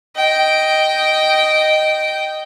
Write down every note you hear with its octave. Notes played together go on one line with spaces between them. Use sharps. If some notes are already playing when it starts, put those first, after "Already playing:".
D#5 G5